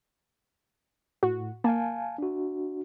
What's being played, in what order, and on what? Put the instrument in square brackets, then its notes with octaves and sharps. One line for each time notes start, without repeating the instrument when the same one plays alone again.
[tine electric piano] A2 [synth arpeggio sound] F#4
[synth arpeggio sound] A#3 [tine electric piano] F5 G#5 A5
[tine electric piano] D4 F#4